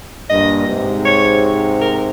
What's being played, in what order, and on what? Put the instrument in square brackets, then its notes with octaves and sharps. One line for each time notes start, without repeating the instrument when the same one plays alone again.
[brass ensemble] G2 A#2 [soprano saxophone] D#5
[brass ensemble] G#2 C3
[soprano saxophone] C#5
A#4